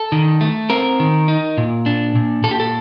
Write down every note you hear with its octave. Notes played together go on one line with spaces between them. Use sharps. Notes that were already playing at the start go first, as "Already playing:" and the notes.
Already playing: A4
D#3
A3
C4 A#4
D#3
D#4
A#2
D4
A#2
A#2 A4
G4
A4